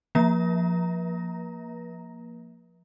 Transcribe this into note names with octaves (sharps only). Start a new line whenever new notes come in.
F3 A#3 A#5 A#6